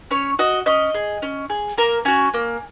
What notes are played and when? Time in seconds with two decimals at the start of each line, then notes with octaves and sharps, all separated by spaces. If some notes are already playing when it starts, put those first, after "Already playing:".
0.11 C#4 C#5
0.39 F#4 D#5
0.66 C#4 D#5
0.94 G#4
1.22 C#4
1.50 G#4
1.78 A#3 A#4
2.05 C#4 F#4 G#5
2.34 A#3